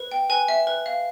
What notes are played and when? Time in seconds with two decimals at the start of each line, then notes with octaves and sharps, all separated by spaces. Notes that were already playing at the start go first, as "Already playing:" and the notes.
Already playing: B4
0.12 G5
0.30 B4 G#5
0.48 E5
0.67 B4
0.86 F5